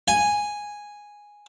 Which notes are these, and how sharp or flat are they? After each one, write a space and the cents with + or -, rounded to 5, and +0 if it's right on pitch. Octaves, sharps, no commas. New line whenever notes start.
G#5 -5